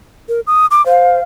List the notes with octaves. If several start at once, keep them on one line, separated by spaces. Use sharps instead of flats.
A#4
D#6
D6
C5 F5